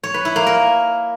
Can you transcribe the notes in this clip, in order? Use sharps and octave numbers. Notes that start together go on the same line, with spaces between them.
C#5
B4
E4
A#3
A#4